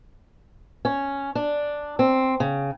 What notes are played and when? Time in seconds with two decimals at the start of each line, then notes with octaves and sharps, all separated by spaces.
0.85 C#4
1.35 D4
1.99 C4
2.40 C#3